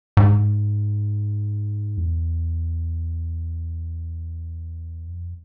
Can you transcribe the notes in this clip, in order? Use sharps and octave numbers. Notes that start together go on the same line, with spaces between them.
G#2
E2
F2